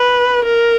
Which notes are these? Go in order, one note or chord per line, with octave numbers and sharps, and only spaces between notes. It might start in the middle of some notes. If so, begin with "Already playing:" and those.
Already playing: B4
A#4